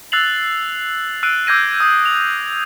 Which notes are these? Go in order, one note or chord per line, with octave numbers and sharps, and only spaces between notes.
E6 F#6 A6 C7 F7 F#7
E6 F#6 C7 D7 D#7
D6 E6 G6 G#6 A#6 D#7
D#6 E6
F7